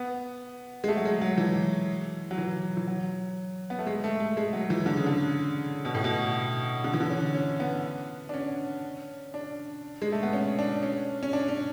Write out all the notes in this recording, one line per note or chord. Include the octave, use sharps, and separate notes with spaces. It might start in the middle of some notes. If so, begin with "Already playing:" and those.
Already playing: B3
G#3
A3
F#3
G#3
F#3
E3
F#3
E3
E3
F#3
B3
A3
G#3
A3
A3
G#3
F#3
E3
D3
C#3
D3
B2
A2
B2
D3
E3
D3
C#4
C#4
B3
D4
C#4
D4
G#3
A3
B3
C#4
D4
C#4
C#4
D4
C#4